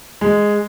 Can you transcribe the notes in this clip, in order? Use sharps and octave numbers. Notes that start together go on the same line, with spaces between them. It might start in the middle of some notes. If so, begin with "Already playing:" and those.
G#3